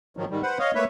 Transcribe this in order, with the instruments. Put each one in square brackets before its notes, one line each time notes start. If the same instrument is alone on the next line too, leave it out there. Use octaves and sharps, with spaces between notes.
[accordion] G#2 D#3 F3 F#3
G#2 D#3 G3
B4 C5 F#5
C#5 D#5 F5
A3 A#3 B4 C#5 E5